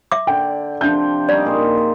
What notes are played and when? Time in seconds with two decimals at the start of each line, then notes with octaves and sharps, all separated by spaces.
0.12 E5 D6
0.27 D3 G5
0.81 C3 F3 D4 G6
1.29 G3 C#4 D#4 D5
1.45 A#2 G#4 C5